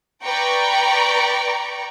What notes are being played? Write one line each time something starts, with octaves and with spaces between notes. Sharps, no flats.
B4 D5 G5 A#5 C#6